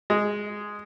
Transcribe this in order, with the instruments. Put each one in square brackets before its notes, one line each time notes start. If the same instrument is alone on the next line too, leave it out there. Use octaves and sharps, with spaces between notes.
[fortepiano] G#3